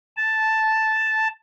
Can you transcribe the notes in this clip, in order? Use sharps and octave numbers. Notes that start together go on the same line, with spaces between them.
A5